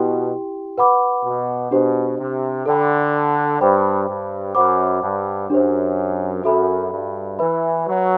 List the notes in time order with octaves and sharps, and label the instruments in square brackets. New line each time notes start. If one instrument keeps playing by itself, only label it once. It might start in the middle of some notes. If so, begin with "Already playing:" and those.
Already playing: [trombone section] B2 [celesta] E4 G4 G5 C6
[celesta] B4 F#5 B5 D6
[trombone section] B2
[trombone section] B2 [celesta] D4 G4 C5
[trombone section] C3
[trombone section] D3 [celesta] A4 D5 G5 B5
[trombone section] G2 [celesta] C5 G5 B5 D6
[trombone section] G2
[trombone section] F#2 [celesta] C5 F#5 B5 D6
[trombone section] G2
[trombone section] F#2 [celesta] D4 G4 C5
[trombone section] F#2 [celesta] F#4 A4 E5 B5
[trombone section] G2
[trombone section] E3 [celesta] B4 E5 B5
[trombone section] F#3